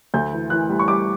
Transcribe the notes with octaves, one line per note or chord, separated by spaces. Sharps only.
D2 G6
E3
E3 F#6
G3
C#6
G3 D6